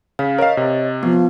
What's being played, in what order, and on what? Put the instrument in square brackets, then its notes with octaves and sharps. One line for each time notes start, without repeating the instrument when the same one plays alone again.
[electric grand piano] C#3 [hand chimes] F5
[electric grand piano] A#4 F5 [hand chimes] C#5 D#5
[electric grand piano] C3
[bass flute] F3 [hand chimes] B3